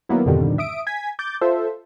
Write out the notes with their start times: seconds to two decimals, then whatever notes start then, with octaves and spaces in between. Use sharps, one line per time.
0.09 D#3 F#3 A#3 B3 E4
0.26 F2 G#2 B2 D3 D#3 G3
0.58 E5 D#6 D7
0.87 G#5 G#6 B6
1.19 D6 G6 A6
1.41 F4 A4 C5 E5